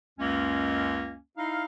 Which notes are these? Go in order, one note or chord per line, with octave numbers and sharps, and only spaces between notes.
C#2 F#2 G#3 A#3 C#4
D#4 E4 F5